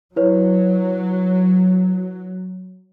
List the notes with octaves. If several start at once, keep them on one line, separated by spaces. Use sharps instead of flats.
F#3 E4 B4 C#5